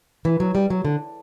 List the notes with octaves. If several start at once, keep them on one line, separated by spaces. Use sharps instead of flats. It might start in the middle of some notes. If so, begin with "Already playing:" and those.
E3
F#3
G3
F#3
D3